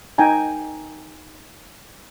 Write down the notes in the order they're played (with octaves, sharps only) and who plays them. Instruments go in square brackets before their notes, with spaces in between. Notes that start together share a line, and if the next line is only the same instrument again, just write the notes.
[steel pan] D#4 G5 G#5 A#5